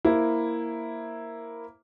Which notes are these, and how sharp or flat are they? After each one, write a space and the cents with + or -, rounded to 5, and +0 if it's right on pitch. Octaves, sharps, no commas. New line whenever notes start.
A#3 +0 E4 +0 C5 +0